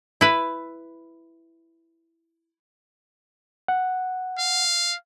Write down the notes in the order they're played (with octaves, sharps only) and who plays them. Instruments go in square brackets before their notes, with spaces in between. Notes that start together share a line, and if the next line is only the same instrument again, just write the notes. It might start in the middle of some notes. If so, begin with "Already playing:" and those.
[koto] E4 B4
[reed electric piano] F#5
[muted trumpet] F5